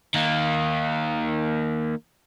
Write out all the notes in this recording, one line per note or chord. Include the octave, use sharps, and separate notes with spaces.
D#3 A#3